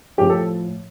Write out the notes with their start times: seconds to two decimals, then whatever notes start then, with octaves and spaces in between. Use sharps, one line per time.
0.18 A2 F3 G4
0.30 A4